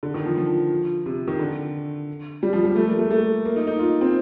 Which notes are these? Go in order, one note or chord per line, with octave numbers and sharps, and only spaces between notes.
D3
D#3
F3
F3
C3
D#3
D3
G3
F3
G3
A3
A#3
A3
A3
A#3
D#4
D#4
F4
C4